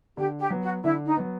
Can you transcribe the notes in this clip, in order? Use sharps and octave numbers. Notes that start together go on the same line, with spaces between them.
D3 G4
G4
F#3 B3
F#4
D3 E4
D#4
F#3 B3